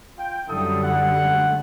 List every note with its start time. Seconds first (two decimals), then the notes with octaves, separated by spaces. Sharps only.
0.17 F4 G5
0.47 F#2 D3 G3 E4 A4 D#6
0.83 F#5
1.30 A3